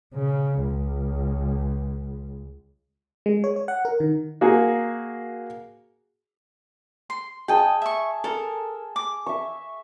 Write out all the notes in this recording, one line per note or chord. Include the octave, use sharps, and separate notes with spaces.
C#3
C#2
G#3
C#5
C#5
F#5
A#4
D#3
A#3 F#4 G#4
C6
G#4 D#5 G5 A5
E5 C#6
A4 A#4 E6
D6
E5 C#6